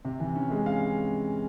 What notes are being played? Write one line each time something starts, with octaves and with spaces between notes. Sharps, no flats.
C3
E3
C#4
G#3
C#4 F5